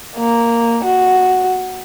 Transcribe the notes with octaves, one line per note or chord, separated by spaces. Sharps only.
A#3
F#4